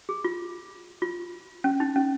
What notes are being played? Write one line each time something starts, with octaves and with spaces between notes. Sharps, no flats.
G#4
F4
F4
C#4
D#4
C#4